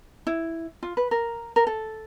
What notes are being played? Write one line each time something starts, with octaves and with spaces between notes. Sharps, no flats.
E4
F4
B4
A#4
A#4
A4